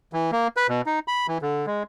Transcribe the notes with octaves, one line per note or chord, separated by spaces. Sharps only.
E3
A#3
B4
B2
D#4
B5
E3
D3
G#3